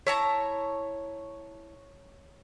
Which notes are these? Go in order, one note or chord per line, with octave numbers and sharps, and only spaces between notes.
E4 C#5 A5 A#5